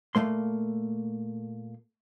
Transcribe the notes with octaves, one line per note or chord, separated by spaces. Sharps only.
A#2 F3 A3 A#3 C6